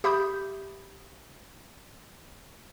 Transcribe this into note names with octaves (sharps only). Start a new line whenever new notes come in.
G4 E5 B5 D#6 G6